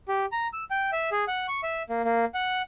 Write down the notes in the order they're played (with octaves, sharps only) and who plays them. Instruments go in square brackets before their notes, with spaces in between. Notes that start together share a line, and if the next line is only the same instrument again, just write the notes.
[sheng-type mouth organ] G4
A#5
E6
G5
E5
G#4
F#5
C#6
E5
A#3
A#3
F#5